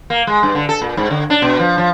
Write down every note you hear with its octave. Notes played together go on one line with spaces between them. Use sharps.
A#3
G#3
G2
D3
A4
A#2
G#2
D3
D4
B2
F3
F3